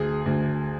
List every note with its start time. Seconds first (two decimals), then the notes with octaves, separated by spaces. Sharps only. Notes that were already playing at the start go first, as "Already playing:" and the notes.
Already playing: D2 G#4
0.26 D2